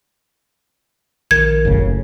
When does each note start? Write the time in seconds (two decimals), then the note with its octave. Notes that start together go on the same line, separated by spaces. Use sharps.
1.31 A#1 D#3 A#4 G#6
1.65 F#1 A2 C#3